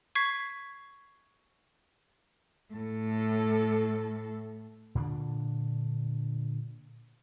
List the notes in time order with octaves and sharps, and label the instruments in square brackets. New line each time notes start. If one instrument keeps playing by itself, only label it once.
[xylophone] C#6 G#6 B6 C7
[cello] A2 A4
[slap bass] A#2 D3 C#4 D4